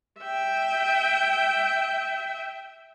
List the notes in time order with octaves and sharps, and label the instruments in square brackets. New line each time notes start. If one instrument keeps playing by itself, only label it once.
[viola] E5 G5